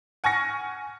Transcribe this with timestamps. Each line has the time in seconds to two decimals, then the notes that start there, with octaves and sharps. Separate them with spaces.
0.24 F#5 G#5 C#6 F6 A#6 C#7